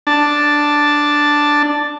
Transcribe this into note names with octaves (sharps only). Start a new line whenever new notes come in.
D4 A5